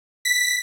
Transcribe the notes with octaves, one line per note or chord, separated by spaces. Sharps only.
B6